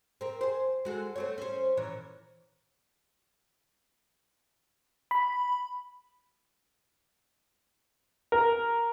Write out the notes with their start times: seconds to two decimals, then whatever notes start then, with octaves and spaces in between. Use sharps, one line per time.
0.21 C4 A#4
0.41 G#4 C5
0.85 G#3 F#4 A4
1.16 A3 C4 C#5
1.38 C#4 C5
1.77 A#2 E3 C#5
5.11 B5
8.32 A#4